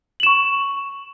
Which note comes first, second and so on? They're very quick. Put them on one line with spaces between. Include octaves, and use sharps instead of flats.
F#7 E7 C#6